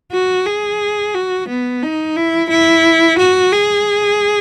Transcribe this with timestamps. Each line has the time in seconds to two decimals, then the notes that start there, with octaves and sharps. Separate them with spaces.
0.12 F#4
0.46 G#4
1.14 F#4
1.48 B3
1.82 D#4
2.16 E4
2.50 E4
3.19 F#4
3.52 G#4